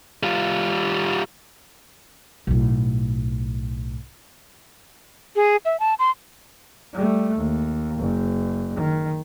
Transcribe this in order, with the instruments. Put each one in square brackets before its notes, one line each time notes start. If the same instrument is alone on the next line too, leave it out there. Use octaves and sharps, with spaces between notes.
[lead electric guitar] G3 F4
[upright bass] B1 A2
[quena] G#4
E5
A5
C6
[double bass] G3 A3
D#2
F#1
D#3